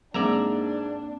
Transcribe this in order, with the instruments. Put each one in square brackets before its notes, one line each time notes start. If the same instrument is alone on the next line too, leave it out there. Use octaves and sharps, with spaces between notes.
[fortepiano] G#2 [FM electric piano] A#3 C4 [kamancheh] D4 [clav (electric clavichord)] D5 E5 A#5